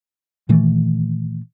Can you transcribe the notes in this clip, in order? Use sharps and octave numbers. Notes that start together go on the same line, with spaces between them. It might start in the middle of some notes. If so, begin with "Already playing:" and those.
A#2 D#3 E3 A3